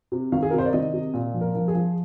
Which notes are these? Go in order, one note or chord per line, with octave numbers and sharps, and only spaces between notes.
C3
D#3 F5
G#4
C3 A#4
C5
D5
D#3 D#5
C3
A#2
F3
A#4
F3
G#4
F3